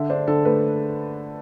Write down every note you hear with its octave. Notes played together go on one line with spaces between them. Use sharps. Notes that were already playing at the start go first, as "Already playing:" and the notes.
Already playing: D3 E5
D4 C5
D3 A4
A3 B4